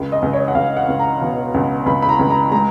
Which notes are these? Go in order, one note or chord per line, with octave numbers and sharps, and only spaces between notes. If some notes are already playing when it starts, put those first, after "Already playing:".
Already playing: C#2
D#5
C#2
C#5
F#5
C#2 F5
F#5
C#2
A#5
B2
C#2
C#2 B5
B5
A#5
C#2
A#5
G#3 A#5